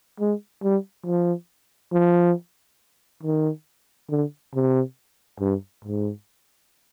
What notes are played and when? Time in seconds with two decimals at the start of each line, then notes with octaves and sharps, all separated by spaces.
0.20 G#3
0.63 G3
1.06 F3
1.93 F3
3.23 D#3
4.10 D3
4.54 C3
5.40 G2
5.84 G#2